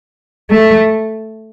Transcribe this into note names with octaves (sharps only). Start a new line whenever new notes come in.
A3